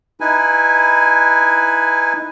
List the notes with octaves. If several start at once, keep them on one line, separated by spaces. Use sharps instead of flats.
D#4 E4 B4 G#5